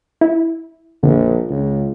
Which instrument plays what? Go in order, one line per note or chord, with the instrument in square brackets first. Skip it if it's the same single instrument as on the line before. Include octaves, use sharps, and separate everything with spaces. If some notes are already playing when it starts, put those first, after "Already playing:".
[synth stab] E4
[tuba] A#1 [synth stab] F2 D3
[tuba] C#2